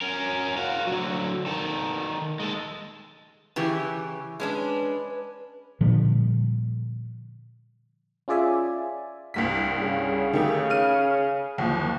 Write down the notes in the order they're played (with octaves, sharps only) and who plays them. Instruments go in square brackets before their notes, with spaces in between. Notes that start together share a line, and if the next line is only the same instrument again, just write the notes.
[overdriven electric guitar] C#4 A#4
F#4 F5
D3 F#3
D#3 A4
G#3 A4
[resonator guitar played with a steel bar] C#3 E3 G4
[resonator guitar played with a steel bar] G#3 C#4 D4 [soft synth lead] B4
[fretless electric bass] A#2 D3 F3 G3
[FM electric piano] C#4 F4 G#4 D5 E5 G#5
[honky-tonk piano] C2 G2 B6
[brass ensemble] C#3
[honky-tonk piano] D#3 A3 G4
F6 D#7
F#1 D#2 F3